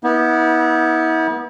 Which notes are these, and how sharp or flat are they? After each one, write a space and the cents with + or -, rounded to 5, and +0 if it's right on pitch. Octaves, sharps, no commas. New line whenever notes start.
B3 -25 E4 -45